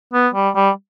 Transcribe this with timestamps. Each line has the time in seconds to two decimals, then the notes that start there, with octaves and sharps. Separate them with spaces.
0.13 B3
0.35 G3
0.55 G3